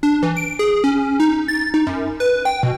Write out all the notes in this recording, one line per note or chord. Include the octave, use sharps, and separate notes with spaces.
D4
E3
D7
G#4
C#4
D#4
A6
D#4
F#2
B4
G5
B2